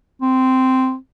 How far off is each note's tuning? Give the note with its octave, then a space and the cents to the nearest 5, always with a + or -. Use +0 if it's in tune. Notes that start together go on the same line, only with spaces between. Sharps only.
C4 -10